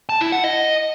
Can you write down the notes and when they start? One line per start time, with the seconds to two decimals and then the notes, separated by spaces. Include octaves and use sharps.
0.09 A5
0.21 E4
0.32 F#5
0.44 D#5